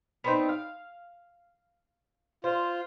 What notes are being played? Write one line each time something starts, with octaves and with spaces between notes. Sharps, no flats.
B3 C4 D#4
F5
F4 C5